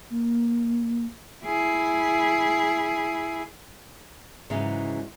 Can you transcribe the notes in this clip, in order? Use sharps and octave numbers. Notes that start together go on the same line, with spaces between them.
A#3
E4 G#4
G#2 C#3 E3 F#3 G#3 C#4